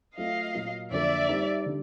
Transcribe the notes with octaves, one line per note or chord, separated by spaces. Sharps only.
F#3 A3 C4 F4 A4 D#5 F5
A#2 F#3 A#3
F2 D3 F#3 A#3 D5 E5
G3 C4 D#4
D3 G3